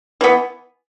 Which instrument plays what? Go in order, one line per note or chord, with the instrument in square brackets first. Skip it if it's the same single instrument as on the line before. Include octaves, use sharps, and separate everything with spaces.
[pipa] E3 B3